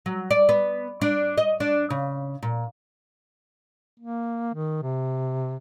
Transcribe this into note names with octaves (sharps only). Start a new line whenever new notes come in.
F#3
D5
B3
D4
D#5
D4
C#3
A#2
A#3
D#3
C3